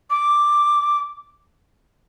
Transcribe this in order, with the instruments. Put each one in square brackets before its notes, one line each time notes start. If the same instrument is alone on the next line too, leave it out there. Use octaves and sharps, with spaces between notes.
[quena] D6